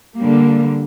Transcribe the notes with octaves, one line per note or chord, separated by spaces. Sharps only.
D3 G3 A#3